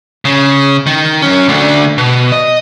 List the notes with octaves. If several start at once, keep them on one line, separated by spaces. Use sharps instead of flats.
C#3
D#3
F#2 C#4
D2 D3
B2
D#5